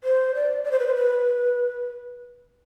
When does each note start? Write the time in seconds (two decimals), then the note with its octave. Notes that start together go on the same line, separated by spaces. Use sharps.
0.04 C5
0.35 D5
0.64 D5
0.71 C5
0.79 B4
0.87 C5
0.95 B4